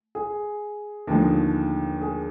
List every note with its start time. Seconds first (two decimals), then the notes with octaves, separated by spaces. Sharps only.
0.15 G#4
1.07 D#2 D3 F3 G#3
2.01 G#4